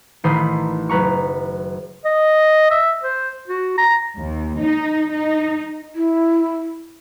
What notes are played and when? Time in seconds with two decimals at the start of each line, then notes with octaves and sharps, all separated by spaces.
0.24 A1 D#3 C5 B5 D#6 C7
0.89 F#1 B4 A#5 C#6
2.05 D#5
2.71 E5
3.04 C5
3.48 F#4
3.78 A#5
4.18 D#2
4.60 D#4
5.11 D#4
5.95 E4